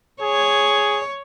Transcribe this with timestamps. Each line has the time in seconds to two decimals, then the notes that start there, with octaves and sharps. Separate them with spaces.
0.23 G#4 C#5